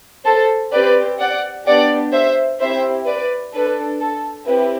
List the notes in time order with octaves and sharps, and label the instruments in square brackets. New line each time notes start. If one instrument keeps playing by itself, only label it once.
[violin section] A4 C5
C4 G4 B4 D5
D5 F#5
B3 D4 G4 D5 F#5
C5 E5
C4 E4 G4 C5 E5
B4 D5
D4 A4 B4
A4
C4 E4 G4 B4